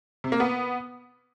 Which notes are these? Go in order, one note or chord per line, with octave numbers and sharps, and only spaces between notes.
C3
A#3
B3